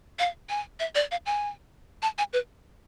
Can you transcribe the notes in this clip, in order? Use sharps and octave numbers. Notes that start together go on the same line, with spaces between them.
F5
G#5
E5
D5
F5
G#5
A5
G#5
B4